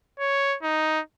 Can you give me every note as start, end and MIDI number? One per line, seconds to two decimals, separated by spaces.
0.20 0.57 73
0.63 1.01 63